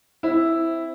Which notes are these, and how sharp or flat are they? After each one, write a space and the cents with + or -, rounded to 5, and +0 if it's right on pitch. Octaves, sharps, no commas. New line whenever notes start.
C4 +0 E4 +0